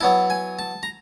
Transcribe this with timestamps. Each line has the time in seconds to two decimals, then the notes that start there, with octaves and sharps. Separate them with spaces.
0.01 F#3 B3 E4 A5
0.30 G#5
0.59 A5
0.83 A#5